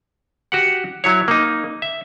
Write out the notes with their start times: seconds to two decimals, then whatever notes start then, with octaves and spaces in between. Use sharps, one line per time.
0.52 F#4 G4 F#5
1.04 F#3 E4 C#5
1.28 A#3 D#4
1.82 E5